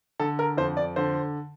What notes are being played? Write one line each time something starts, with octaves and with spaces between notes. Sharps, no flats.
D3 A4
A#4
F2 C5
D5
D3 C5